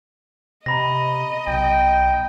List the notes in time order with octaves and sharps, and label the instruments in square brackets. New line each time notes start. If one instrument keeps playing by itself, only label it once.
[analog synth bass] C3 [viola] D#5 [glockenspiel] A#5 B5 A#6
[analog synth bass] B1 [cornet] G5